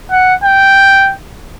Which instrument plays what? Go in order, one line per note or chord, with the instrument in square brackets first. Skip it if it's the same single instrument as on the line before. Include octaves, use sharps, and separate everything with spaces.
[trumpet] F#5
G5